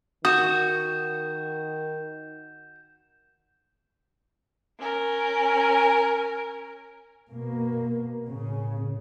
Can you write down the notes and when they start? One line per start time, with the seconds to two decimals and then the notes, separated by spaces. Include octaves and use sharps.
0.25 D#3 F#4 D#6 G6 E7
4.79 C#4 A#4
7.29 B2 A#3
8.27 A2 C#3